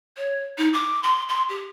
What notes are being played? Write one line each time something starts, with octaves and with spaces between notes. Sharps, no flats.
C#5
D#4
D6
C6
C6
G4